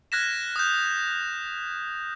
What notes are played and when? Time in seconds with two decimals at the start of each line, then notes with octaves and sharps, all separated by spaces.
0.12 F6 F#6 G#6 A#6 B6 E7
0.56 D#6 G6